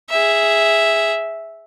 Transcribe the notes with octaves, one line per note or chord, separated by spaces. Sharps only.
G#4 E5